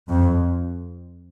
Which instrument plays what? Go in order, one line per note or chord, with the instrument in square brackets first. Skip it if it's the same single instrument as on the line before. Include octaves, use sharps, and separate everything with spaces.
[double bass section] F2